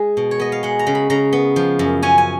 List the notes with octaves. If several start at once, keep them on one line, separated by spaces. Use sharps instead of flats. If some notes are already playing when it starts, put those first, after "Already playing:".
Already playing: G#3 G#4
B2
C#5
B3 D#5
F5
G#3 F#5
A#5
C#3
B5
C#3 A#5
B3
F3
F#2
C#4 G#5
G#5